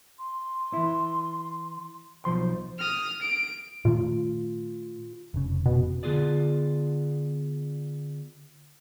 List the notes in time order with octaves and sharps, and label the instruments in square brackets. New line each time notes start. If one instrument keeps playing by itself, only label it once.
[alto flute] C6
[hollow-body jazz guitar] E3 E4
[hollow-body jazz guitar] B1 F3 C6 [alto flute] C5
[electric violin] D#6 F6
D7
[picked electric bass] A#2 D#3 A3 [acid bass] F4
[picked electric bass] F1 C#3
[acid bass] B2
[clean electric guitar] D3 B3 F4 G#4 D5